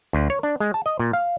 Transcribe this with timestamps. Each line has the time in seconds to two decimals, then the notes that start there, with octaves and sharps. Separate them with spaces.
0.13 D2
0.30 C#5
0.43 D4
0.60 G#3
0.74 A5
0.86 D#5
0.99 A#2
1.13 F5